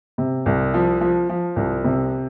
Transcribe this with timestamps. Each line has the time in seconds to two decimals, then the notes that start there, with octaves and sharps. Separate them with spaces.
0.18 C3
0.46 C2
0.74 F3
1.01 F3
1.29 F3
1.56 C2
1.84 C3